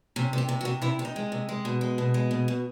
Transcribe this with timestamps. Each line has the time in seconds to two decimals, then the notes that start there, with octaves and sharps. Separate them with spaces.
0.16 C3 C#4
0.33 C3 G4
0.49 C3
0.61 F#4
0.65 C3
0.82 C3 E4
0.99 C3
1.05 D#4
1.16 G#3
1.32 C3
1.49 G#3
1.65 B2
1.81 G#3
1.98 B2
2.14 G#3
2.31 B2
2.48 B2